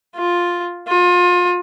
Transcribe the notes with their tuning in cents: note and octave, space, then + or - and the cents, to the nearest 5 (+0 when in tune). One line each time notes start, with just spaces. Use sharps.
F4 +5
F4 +30